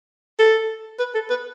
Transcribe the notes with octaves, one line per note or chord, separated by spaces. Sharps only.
A4
B4
A4
B4